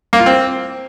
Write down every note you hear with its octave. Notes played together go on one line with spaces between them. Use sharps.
A#3
F4
C4